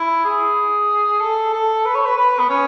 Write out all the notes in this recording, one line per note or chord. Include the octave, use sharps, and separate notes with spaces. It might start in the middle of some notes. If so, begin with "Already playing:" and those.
Already playing: E4
G#4
A4
A4
B4
C#5
B4
B4
B3
C#4